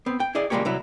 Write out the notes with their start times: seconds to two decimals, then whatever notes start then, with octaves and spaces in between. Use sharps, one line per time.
0.06 B3 C4
0.20 G5
0.35 E4 G#4 D5 D#5
0.50 C#2 G3 G#3 A#3 G4 C#5
0.65 C2 F#3 E4